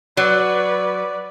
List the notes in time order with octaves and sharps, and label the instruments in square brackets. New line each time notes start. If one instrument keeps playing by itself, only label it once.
[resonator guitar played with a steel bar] F#3 [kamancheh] B4 D5